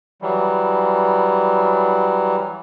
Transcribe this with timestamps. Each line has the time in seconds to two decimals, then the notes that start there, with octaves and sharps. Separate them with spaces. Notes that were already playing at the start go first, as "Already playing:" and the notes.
0.22 E3 F#3 G3